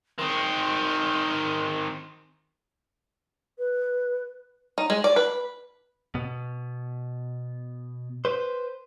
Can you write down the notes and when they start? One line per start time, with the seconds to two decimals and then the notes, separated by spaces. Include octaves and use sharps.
0.19 D#3 C4 C6
3.58 B4
4.78 D#4
4.90 G#3
5.04 D5
5.16 B4
6.15 B2
8.25 B4 C5